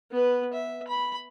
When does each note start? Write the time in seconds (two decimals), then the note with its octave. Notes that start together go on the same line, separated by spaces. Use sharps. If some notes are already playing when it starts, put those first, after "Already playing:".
0.12 B3 B4
0.53 E5
0.88 B5